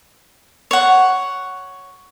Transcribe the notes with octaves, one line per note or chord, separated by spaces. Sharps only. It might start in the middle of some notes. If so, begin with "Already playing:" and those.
C#5 F#5